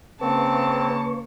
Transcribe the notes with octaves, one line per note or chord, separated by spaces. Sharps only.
C#3 A#3 C4 B4 A5 C#6